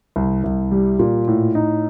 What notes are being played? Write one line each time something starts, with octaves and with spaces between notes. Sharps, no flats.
C2
C2
G3
A#2
A2
D#4